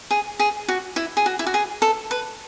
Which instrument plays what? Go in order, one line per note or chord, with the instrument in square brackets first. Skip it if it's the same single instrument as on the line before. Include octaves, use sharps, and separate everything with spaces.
[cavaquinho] G#4
G#4
F#4
E4
G#4
F#4
E4
F#4
G#4
A4
B4